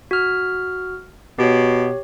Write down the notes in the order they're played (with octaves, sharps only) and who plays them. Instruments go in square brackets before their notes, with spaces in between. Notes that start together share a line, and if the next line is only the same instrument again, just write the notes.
[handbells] F#4 F6
[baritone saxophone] B2 [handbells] G4 C#5